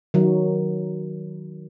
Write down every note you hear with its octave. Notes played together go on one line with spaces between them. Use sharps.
D#3 F#3